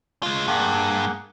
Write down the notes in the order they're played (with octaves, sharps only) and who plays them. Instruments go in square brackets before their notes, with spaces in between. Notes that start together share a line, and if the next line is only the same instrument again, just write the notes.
[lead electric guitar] G#3 F4
[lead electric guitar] G2 [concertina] A#3 G#4 F#5